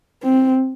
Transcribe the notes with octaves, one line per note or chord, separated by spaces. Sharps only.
C4